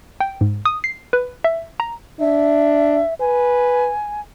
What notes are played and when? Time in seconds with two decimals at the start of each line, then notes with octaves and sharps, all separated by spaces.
0.20 G5
0.41 G#2
0.65 D#6
0.84 C7
1.13 B4
1.44 E5
1.80 A#5
2.20 D4 E5
3.20 B4 G#5